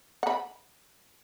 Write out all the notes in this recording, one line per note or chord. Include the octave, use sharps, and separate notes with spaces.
F#5 B5